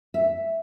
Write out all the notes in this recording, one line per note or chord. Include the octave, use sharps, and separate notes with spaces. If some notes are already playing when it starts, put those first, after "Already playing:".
E5